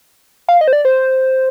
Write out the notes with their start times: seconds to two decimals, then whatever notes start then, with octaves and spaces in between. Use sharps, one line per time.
0.49 F5
0.61 D#5
0.68 C5
0.73 D5
0.85 C5